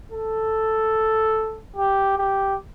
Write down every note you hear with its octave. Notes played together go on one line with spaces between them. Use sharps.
A4
G4
G4